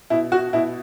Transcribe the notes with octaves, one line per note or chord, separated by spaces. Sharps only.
B2 E4
F#4
B2 E4